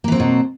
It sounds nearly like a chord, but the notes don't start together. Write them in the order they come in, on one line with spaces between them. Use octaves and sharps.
A#3 E3 C4 F#3 B2